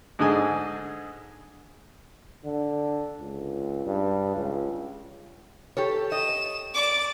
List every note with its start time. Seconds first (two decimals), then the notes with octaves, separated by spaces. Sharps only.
0.19 G#2 D3 G#4 D#5 G#5
2.45 D3
3.21 C#2
3.86 G2
4.36 C#2
5.77 G4 A4 C#5
6.12 D#5 E7
6.74 D5 D6